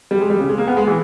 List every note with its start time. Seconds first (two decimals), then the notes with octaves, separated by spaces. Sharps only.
0.11 G3
0.21 G#3
0.30 G3
0.40 C#3
0.49 G#3
0.58 A#3
0.68 B3
0.77 G#3
0.87 E3